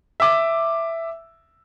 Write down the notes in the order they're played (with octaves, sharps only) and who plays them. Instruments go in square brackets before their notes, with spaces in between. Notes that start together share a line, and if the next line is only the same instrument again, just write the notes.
[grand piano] E5 D6